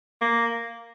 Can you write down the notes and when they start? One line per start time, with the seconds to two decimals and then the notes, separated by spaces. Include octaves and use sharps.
0.21 A#3